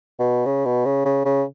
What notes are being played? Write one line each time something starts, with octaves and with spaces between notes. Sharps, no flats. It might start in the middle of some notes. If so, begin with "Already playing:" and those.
B2
C#3
B2
C#3
C#3
C#3